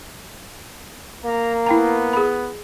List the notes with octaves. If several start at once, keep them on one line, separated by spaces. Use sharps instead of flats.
A#3 A#5
B3 E4 G5 A#5
G#4 B5